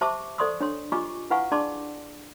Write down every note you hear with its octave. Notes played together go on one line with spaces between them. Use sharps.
G4 C5 E5 A5 C#6 D6
A4 C5 D5 C6 C#6 D#6
D4 C#5 C6
F4 G4 D#5 G#5 C#6 D6
E4 B4 F5 F#5 G#5 C#6
D4 G#4 D5 A5 C6 D6